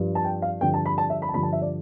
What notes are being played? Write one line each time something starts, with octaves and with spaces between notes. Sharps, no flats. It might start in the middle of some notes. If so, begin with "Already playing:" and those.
Already playing: G2 F3
A5
G5
F5
G2 D3 F3 G5
A5
B5
A5
E5
B5
A5
G2 D3 F3 B5
A5
E5
D5